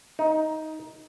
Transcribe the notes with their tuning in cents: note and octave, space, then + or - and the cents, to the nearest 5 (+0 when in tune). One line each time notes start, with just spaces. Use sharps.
D#4 +10